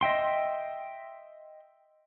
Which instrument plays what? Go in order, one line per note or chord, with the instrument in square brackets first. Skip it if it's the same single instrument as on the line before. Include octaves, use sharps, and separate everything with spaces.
[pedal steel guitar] D#5 E5 G5 C6